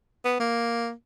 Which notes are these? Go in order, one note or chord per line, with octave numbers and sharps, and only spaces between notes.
B3
A#3